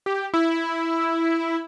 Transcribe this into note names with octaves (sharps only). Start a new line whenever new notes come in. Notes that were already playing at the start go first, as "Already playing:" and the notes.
G4
E4